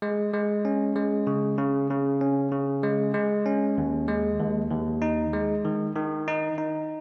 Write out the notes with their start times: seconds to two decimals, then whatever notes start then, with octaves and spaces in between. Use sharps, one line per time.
0.02 G#3
0.34 G#3
0.65 C#4
0.96 G#3
1.27 C#3
1.58 C#3
1.90 C#3
2.21 C#4
2.52 C#3
2.83 G#3
3.14 G#3
3.46 C#4
3.78 D#2
4.08 G#3
4.39 D#2
4.71 D#2
5.02 D#4
5.34 G#3
5.65 D#3
5.96 D#3
6.28 D#4
6.58 D#4